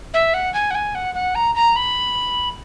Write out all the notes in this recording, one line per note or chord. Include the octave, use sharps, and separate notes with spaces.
E5
F#5
G#5
F#5
G#5
F#5
F#5
A#5
A#5
B5